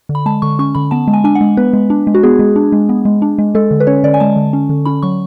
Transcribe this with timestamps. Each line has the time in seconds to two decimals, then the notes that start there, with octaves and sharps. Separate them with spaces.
0.09 D3
0.15 B5
0.26 G#3 A5
0.42 D3 C#6
0.59 C#4 C#6
0.75 D3 B5
0.91 B3 A5
1.08 G#3
1.14 G#5
1.24 D4 G#5
1.35 F#5
1.41 G#3
1.57 B3 B4
1.73 G#3
1.90 D4
2.07 G#3
2.15 F#4
2.23 B3 G#4
2.39 G#3
2.56 D4
2.72 G#3
2.89 B3
3.05 G#3
3.22 D4
3.38 G#3
3.55 G#3 A4
3.71 D3
3.80 B4
3.87 C#4 C#5
4.04 D3 D5
4.14 G#5
4.20 G#3 A5
4.36 D3
4.53 C#4
4.70 D3
4.85 C#4 B5
5.03 F#3 C#6